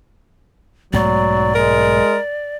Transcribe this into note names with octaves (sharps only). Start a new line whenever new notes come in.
B1 G#2 F#3 A3 D5
G#3 A#4